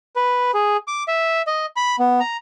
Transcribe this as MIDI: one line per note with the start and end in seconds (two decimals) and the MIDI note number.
0.16 0.51 71
0.54 0.77 68
0.88 1.03 86
1.08 1.42 76
1.47 1.66 75
1.76 1.96 83
1.99 2.20 59
2.20 2.37 82